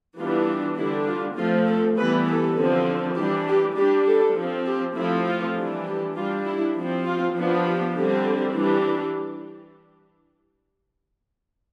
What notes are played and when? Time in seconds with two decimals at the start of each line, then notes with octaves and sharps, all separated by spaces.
0.18 E3 G3 B3 D4 F4
0.48 F4
0.78 D3 G3 D4 E4
1.07 F4
1.37 F3 A3 C4 F4
1.68 A4
1.97 E3 G3 B3 B4
2.27 A4
2.57 D3 F3 C4
3.16 E3 G3 D4 G4
3.47 G4
3.77 G3 D4 G4
4.06 A4
4.36 F3 C4
4.67 G4
4.96 F3 A3 C4 E4
5.27 F4
5.56 E3 G3 D4
5.86 G4
6.16 G3 D4 F4
6.45 E4
6.76 F3 C4
7.05 F4
7.35 F3 B3 D4
7.66 G4
7.96 D3 G3 C4
8.54 E3 G3 D4